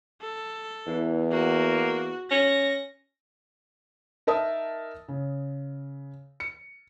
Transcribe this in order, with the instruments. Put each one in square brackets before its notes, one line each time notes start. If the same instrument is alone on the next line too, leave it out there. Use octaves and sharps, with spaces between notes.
[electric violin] A4
[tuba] E2 [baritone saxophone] E3
[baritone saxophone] A#3 [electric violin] F#4
[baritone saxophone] C#4 [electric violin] A#6
[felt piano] D#4 A#4 E5 A5 D#6
C#3
C#7